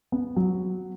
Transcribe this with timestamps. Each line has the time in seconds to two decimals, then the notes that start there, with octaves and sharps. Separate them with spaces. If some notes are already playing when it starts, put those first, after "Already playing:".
0.12 B3
0.36 F#3